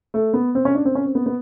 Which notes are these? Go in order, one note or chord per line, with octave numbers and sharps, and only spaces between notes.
A3
B3
C4
C#4
D4
C4
C#4
C4
B3
B3